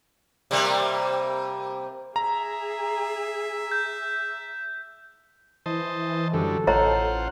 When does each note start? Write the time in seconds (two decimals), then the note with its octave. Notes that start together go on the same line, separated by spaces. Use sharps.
0.51 C3 G3 A#3
2.16 G#4 E5 A#5
3.72 G6
5.66 E3 C5 D#5 A5
6.34 F#2 D3 G3 A4
6.67 A1 F4 C5 C#5 D#5 F#5 A#5